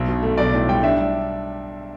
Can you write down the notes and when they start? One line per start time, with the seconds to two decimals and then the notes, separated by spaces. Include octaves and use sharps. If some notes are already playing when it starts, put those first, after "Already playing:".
Already playing: B1
0.08 B2
0.23 A3
0.38 B1 D5
0.54 A2
0.69 G3 G5
0.83 D4 E5